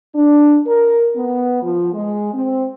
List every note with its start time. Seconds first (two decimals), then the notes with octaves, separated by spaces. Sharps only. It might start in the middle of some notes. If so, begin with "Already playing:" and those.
0.14 D4
0.66 A#4
1.15 B3
1.62 F3
1.93 G#3
2.34 C4